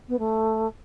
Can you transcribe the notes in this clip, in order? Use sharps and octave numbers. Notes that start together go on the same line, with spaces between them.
B3
A3